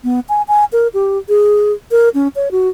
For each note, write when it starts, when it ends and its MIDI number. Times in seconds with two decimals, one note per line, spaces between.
0.04 0.20 59
0.29 0.42 80
0.48 0.65 80
0.72 0.88 70
0.94 1.18 67
1.29 1.72 68
1.91 2.09 70
2.14 2.28 61
2.36 2.49 73
2.51 2.69 66